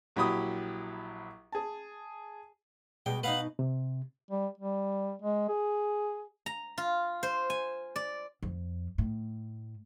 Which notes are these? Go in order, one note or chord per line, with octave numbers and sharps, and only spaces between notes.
A#1 F#3 E4 G4 B5 D#6
G#4 A5
B2 G3 G#3 G5
B2 D#4 B4 F5 F#5
C3
G3
G3
G#3
G#4
A#5
F4
C5
G#5
D5
F2
A2